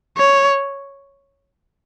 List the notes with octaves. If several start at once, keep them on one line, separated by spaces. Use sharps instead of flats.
C#5